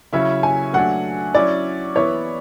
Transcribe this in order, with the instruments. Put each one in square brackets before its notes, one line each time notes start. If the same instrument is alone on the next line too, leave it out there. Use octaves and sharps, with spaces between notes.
[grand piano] C#3 F#3 C#4 E4 [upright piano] E5
[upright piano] G#5
[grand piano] F#3 A3 D4 [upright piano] F#5
[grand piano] F#3 C#4 E4 [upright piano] D5
[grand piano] E3 B3 E4 [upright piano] C#5